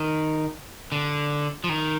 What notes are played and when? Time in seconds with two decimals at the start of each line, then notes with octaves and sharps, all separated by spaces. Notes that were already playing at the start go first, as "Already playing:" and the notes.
Already playing: D#3
0.92 D3
1.64 F3
1.69 D#3